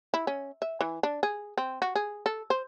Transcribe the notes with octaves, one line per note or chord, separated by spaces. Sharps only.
E4
C#4
E5
E3
D4
G#4
C4
F#4
G#4
A4
C5